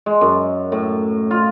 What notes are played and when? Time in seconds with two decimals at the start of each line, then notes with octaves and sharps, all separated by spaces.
0.06 G#3
0.21 F#2
0.72 A2
1.31 F4